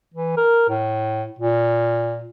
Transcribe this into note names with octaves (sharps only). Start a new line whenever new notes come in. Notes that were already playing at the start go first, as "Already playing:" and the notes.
E3
A#4
A2
A#2